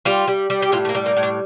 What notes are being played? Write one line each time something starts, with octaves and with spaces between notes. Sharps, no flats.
G3 F4
G3
G3
G4
A2 F4
A3
A#3
G3
A#3
A2
D4